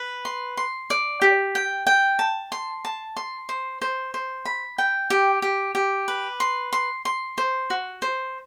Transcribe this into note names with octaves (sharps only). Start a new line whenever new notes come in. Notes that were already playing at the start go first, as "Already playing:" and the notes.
Already playing: B4
C6
C6
D5
G4
G5
G5
A5
C6
A5
C6
C5
C5
C5
B5
G5
G4
G4
G4
B4
C6
C6
C6
C5
F#4
C5